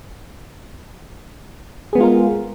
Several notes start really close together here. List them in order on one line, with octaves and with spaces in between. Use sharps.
G#4 B3 G#3 F4 A#4